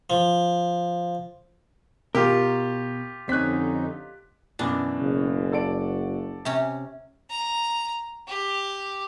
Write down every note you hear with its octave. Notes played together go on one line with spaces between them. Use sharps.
F3
B2 F4 G4 A#4
F2 D3 C4 C#4 D#4 F#6 B6
F#2 B2 E3 D4
F#1 C#3
F#4 A4 D5 D7
C3 C#4
A#5
G4